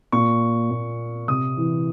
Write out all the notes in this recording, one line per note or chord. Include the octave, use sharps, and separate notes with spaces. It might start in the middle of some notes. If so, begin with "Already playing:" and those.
A#2 C#6
A#2
C3 D#6
E3